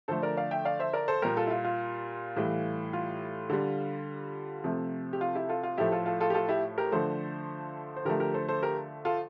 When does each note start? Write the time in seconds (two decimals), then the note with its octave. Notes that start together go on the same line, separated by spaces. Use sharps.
0.08 D3 F3 A3 A4 C5
0.22 A#4 D5
0.37 D5 F5
0.51 E5 G5
0.65 D5 F5
0.79 C5 E5
0.93 A#4 D5
1.08 A4 C5
1.22 A#2 G3 G4 A#4
1.37 F4 A4
1.47 E4
1.51 F4
1.65 F4
2.37 A2 E3 G3
2.93 F4
3.50 D3 G3
4.64 C3 F3 A3
5.13 G4
5.21 F4
5.35 E4 G4
5.49 F4 A4
5.63 F4
5.78 A2 F3 A3 E4 G4
5.92 F4 A4
6.06 F4 A4
6.20 F4 A4
6.30 G4
6.34 F4 A4
6.49 E4 G4
6.78 G4 A#4
6.92 D3 F3 A3 A4 C5
7.96 C5
8.05 D3 F3 A3 G4 A#4
8.20 G4 A#4
8.34 A4 C5
8.48 A4 C5
8.63 G4 A#4
9.05 F4 A4